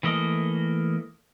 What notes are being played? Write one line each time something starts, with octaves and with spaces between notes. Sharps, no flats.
E3 A3 A#3 D#5